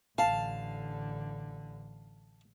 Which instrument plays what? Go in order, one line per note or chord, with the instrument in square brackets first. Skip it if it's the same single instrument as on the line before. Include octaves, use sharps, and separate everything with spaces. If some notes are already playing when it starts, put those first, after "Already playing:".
[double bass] A1 D3 [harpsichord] F5 [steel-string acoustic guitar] A5